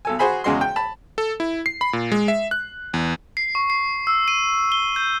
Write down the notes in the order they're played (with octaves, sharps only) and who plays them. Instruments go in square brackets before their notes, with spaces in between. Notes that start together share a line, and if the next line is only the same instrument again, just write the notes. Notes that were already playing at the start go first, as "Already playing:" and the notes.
[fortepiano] B1 A4 G#5
F#4 G#4 C5 G#5 B5
E2 C#3 G#3 F#4 C6
G5
A5 B5
[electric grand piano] A4
E4
C7
B5
A#2
G#3
E5
F#6
E2
[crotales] C7
C#6
C7
E6
D#7
G7
G6